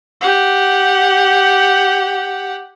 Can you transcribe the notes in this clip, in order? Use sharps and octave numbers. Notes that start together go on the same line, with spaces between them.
G4 F#5